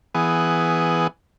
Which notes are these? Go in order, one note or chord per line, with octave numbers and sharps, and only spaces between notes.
E3 B3 G#4